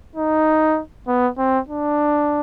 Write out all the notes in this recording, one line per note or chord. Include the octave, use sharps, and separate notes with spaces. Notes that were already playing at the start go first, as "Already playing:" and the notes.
D#4
B3
C4
D4